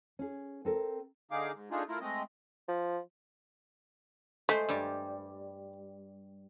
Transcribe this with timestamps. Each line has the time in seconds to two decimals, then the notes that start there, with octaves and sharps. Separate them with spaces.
0.19 C#4 G#4
0.65 C4 A4 A#4
1.31 D3 D#4 G#4 F5 D6
1.53 G#2
1.71 A3 D4 D#4 F4 G#4
1.89 A3 E4 F4 A#4
2.01 G#3 A3 C4 D#5
2.69 F3
4.49 G#3 A3 C5
4.69 G2 G3